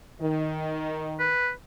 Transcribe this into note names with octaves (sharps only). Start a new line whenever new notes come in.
D#3
B4